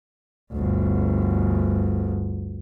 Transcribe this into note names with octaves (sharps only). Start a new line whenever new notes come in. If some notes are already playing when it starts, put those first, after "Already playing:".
G1 D2